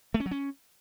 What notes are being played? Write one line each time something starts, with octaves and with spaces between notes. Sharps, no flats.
A3
C#4
F#3
C#4